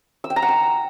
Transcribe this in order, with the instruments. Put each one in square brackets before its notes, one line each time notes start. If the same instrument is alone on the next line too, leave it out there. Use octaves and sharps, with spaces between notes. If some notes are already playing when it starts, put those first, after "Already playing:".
[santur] E6
G5
A#5
F#5
G5